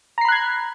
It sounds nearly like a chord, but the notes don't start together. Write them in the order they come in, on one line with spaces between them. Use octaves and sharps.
A#5 C7 B5 F#6 G#6